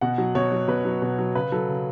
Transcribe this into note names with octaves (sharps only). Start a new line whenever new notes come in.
B2 F#5
F#3
B2 C#5
F#3
B2 B4
F#3
B2
F#3
C#3 B4
F#3 A4
C#3